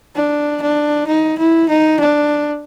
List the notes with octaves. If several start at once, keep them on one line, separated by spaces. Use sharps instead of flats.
D4
D4
D#4
E4
D#4
D4